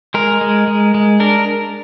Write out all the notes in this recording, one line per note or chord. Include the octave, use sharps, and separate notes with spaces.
G#3 A#4
G#3
G#3
G#3
D4 A#4